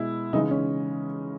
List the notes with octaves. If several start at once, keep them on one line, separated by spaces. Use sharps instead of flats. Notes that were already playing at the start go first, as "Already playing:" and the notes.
Already playing: B2 G#3 E4
C#3 E3 G#3 D#4
C#4